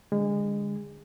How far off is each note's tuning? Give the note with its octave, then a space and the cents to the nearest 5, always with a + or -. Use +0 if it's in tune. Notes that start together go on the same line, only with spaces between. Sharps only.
D3 +0 G#3 -30